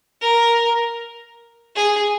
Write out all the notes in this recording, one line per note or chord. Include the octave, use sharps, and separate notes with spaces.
A#4
G#4